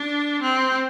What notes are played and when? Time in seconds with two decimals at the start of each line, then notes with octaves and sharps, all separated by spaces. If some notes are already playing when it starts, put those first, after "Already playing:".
Already playing: D4
0.42 C4